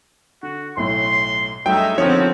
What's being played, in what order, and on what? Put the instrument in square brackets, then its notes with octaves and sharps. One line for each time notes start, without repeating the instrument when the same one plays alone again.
[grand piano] D3 [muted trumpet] F#4
[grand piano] B1 A2 [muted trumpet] C6
[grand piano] G2 F#3 A3 [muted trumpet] G#3 [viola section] D#4 E5 [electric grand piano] G5
[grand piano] D3 D#3 [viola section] F3 B3 C4 [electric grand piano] C#5